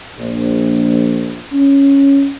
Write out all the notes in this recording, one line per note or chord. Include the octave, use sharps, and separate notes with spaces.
A#1
C#4